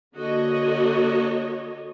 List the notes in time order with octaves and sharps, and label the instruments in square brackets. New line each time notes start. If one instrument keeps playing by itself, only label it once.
[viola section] D3 A#3 F#4 C#5 D#5